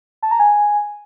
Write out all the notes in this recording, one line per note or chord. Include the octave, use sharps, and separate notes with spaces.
A5
A#5
G#5